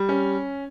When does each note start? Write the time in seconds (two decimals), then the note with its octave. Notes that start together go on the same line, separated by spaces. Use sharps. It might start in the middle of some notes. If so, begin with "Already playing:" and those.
Already playing: G3
0.09 C#4